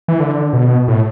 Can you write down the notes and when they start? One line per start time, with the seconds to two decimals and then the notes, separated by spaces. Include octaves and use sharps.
0.08 E3
0.20 D3
0.53 B2
0.88 A2